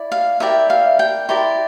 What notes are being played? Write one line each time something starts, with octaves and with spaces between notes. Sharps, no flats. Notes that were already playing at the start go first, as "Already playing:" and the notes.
Already playing: E4 D5
F5
E4 G4 A#4 D5 E5
F5
G5
E4 G4 A#4 D5 C6